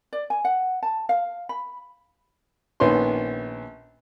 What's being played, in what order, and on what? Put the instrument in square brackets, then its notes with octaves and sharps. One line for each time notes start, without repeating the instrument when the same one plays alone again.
[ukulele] D5
G#5
F#5
A5
F5
B5
[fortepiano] A#1 D#3 B3 C#4 B4 C6